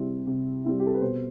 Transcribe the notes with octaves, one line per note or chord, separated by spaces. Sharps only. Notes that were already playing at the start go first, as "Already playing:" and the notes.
Already playing: C3 G3 C4 E4
C3
G3 C4 E4
G4
A4
B4
B2 C5